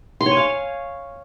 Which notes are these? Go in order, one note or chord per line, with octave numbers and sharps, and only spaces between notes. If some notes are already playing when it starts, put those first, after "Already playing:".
C6
C#5
G#5
F5